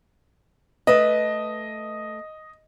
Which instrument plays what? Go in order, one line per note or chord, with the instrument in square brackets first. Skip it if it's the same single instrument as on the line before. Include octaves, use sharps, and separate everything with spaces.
[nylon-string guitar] A3 A4 B4 [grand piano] D#5